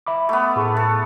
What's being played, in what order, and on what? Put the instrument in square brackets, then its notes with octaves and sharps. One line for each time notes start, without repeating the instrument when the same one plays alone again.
[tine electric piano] E5 B5 D6
[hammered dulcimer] A3 B3
[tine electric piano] A2 G#4 C#6
[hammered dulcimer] A4